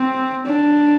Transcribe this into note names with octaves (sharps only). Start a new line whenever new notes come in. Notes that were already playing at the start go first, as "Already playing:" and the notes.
Already playing: C4
D4